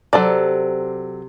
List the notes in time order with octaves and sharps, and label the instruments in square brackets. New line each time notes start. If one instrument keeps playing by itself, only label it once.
[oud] C3 [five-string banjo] F#3 A4 D5